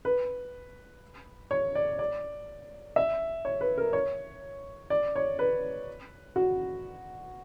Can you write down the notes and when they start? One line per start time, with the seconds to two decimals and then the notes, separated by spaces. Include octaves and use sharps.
0.05 B4
1.51 C#5
1.75 D5
1.99 D5
2.96 E5
3.45 C#5
3.61 B4
3.78 A#4
3.93 C#5
4.90 D5
5.16 C#5
5.39 B4
6.36 F#4